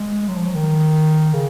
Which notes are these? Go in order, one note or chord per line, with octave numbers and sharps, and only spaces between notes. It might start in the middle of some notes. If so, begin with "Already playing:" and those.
Already playing: G#3
F#3
F3
F#3
D#3
C#3